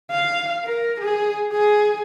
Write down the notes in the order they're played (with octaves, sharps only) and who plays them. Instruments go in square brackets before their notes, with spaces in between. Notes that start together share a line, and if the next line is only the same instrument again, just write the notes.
[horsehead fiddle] F5
A#4
G#4
G#4